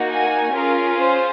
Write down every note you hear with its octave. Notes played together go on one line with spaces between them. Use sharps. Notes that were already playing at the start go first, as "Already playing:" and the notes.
Already playing: A#3 D#4 F#4
G#5
C#4 F4 G#4 A#4
C5